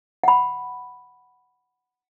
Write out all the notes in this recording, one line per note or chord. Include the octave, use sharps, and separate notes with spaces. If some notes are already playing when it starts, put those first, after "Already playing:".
F#5 B5